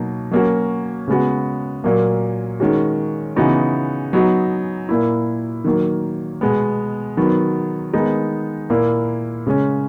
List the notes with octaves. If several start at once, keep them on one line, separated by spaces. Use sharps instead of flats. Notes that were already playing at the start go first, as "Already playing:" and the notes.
Already playing: B2 F#3 A#3 D#4
F#3 A#3 C#4 F#4
C#3 G#3 B3 F#4
A#2 F#3 A#3
D#3 G#3 C#4 F#4
C#3 E3 B3 D#4 F#4
F#3 B3 D#4 F#4
A#2 A#3 E4
D#3 F#3 A#3
B2 G#3 B3
D#3 F#3 B3
D#3 G#3 B3 D#4
A#2 A#3 E4
C#3 G#3 C#4